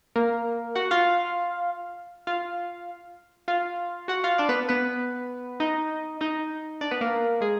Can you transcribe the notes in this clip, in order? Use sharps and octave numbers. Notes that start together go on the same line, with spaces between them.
A#3 A#4
F#4 F#5
F4 F5
F4 F5
F4 F5
F#4 F#5
F4 F5
D4 D5
B3 B4
B3 B4
D#4 D#5
D#4 D#5
D4 D5
B3 B4
A#3 A#4
G#3 G#4